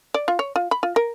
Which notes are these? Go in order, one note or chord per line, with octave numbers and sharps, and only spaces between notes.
D5
F4
C#5
F4
B5
F4
A#4